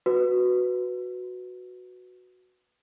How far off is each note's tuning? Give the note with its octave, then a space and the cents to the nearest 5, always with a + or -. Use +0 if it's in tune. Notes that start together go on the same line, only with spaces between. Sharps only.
F#4 -5 B4 +0